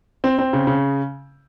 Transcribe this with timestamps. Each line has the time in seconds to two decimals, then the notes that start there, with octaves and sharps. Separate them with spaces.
0.24 C4
0.38 C4
0.53 C#3
0.67 C#3